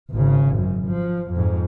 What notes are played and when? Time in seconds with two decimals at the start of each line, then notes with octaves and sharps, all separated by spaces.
0.11 G#1 C#3
0.57 F#2
0.88 F3
1.31 F2 G#2